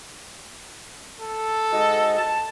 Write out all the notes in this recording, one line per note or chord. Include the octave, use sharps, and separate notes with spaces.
A4
G#2 F#4 D#5
A5